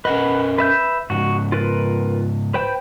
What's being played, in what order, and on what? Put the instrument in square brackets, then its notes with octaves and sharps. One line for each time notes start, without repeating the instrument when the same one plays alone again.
[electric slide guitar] C#4 A#4 D#5 [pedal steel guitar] B4 F#5
[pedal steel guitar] B4 E5 G6
[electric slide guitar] G#2 C#3 [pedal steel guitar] F#4
[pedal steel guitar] F4 A#4 B4
B4 C5 G5